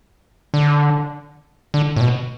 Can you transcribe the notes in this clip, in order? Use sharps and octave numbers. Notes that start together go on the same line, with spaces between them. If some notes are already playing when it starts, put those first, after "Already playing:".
D3
D3
A2
B2